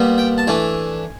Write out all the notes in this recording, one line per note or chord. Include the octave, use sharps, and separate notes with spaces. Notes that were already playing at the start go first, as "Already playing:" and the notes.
Already playing: A#2 G3 B3
G5
A5
E3 A3 D4 G#5